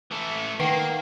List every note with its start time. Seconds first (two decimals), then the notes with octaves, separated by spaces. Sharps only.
0.11 E3 A3
0.60 D#3 A#3 B4 F#5 G5 C7 D7